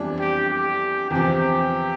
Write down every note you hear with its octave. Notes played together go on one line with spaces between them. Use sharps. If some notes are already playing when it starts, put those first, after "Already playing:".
Already playing: F2 E3 G3 B3 D4
G4
G4
E2 C3 F3 G4